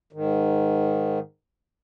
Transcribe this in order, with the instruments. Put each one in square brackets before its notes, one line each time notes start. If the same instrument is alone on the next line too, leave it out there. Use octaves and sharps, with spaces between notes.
[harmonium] G#2 D#3